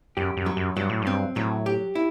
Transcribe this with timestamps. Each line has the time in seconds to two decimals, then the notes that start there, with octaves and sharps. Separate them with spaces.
0.17 F#2 G4
0.37 F#2
0.46 F#3
0.57 F#2
0.76 G2 F#3
0.90 A2
1.02 G2 C4
1.36 A2 F#3
1.66 G4
1.95 E4